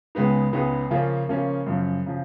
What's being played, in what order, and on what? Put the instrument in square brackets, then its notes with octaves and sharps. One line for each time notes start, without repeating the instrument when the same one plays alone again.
[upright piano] C#2 C#3 G#3 B3 D#4
C#2 C#3 G#3 B3 D#4
C#3 F3 A#3 C#4 F4
C#3 F3 A#3 C#4 F4
F#2 C#3 F3
C#3 F3